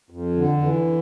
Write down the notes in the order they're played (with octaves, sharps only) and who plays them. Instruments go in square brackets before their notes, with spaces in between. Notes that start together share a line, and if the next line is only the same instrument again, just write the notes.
[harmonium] F2
D3
E3